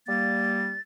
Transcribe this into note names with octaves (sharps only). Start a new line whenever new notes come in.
G3 A#3 A6